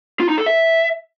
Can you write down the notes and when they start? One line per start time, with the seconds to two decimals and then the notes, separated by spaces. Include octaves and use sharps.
0.20 F4
0.29 D#4
0.38 A4
0.46 E5